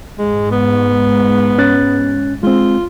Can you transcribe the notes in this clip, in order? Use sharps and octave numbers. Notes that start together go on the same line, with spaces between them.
G#2 G#3
B3
C#4 F#6 A6
G#3 C4 F4